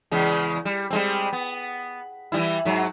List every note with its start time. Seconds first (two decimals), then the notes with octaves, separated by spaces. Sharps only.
0.11 E2 C#3 G#3
0.65 G3
0.91 G3 G#3 C4
1.33 B3
2.32 E3 G3 E4
2.65 G#2 F#3